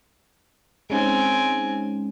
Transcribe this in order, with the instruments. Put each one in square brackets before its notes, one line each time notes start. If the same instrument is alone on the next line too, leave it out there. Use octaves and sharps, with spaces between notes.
[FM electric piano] G#3 C#4 D#4 [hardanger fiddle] C4 G#5